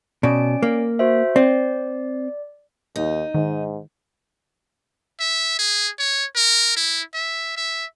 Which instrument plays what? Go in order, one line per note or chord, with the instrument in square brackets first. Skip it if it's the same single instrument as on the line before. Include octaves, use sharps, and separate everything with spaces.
[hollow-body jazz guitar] B2 [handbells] C#4 D5 D7
[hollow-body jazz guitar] A#3
[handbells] F#4 C5 E5
[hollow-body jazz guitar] C4 [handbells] D5
[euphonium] D#2 [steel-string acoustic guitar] D#4
[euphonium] G#2 [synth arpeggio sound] D#3
[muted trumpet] E5
G#4
C#5
A#4
E4
E5
E5